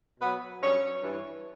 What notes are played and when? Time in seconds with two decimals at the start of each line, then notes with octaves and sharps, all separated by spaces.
0.20 B2 F#3 B3 B4
0.61 G2 F#3 C#4 C#5
1.03 G2 E3